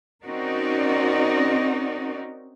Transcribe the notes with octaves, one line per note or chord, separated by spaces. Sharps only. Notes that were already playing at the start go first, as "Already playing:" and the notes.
C4 C#4 D#4 F#4 A#4 D5